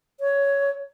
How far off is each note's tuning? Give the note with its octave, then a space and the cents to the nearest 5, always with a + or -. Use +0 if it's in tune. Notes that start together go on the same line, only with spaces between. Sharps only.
C#5 +10